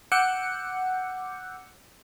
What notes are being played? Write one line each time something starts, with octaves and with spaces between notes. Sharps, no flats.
F#5 D6 E6 F#6 G6 C#7